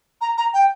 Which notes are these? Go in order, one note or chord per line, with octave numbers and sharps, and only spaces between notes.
A#5
A#5
G5